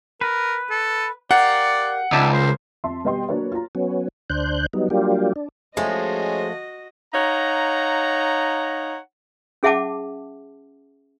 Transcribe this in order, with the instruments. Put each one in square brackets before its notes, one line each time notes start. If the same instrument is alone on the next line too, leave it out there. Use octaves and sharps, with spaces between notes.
[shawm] A#4 [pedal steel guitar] B4
[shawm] A4
[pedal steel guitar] G4 A#4 F5 [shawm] D5 [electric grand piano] F#5
[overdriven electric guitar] C#2 [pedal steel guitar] D#4 D5 A5 [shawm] E5
[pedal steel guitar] A#4 [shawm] C5
[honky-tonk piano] F2 E5 A5 C6
B2 G3 B4 D#5 G5 C6
F#3 A#3 D4 B4 C#5
F4 A#5
[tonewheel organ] F#3 B3 C#4
D2 D4 C5 F#6 G6
F#3 G3 B3 D#4
F#3 G3 A#3 D4 F4 G4
D4
[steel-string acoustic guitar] F3 A3 [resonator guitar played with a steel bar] G#3 [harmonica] C#4 C5 [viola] F#4 D#5
[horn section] D#4 C#5 F5 F#5 A#5
[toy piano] C#4 G#4 E5 F#5 A5 D6